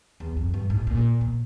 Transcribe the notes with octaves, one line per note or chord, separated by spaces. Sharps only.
E2
F2
G2
A2
A#2
A#2